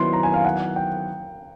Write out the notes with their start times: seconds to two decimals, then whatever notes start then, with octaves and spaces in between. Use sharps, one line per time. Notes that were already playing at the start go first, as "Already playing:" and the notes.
Already playing: D#3 F#3 B3 E4 C6
0.13 A#5
0.23 G#5
0.34 F5
0.45 F#5
0.76 G5